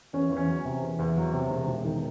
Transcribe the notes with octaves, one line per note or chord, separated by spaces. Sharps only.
E2 C#4
E2
C#4
F#3
C3
E2
E2
F#3
C3
E1
E1
D#3